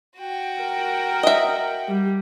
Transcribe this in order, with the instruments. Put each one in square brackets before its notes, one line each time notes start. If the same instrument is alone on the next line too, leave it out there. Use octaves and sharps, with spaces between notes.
[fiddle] F#4 G5
[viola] A#4
[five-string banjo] D#5 E5
[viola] G3